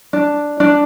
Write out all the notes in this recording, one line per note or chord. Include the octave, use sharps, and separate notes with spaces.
D4
D4